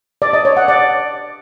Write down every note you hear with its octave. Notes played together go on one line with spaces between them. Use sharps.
D5
D#5
C#5
F#5
D5